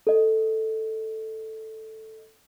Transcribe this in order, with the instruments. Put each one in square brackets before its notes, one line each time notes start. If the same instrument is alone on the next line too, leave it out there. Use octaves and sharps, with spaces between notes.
[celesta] A4 D#5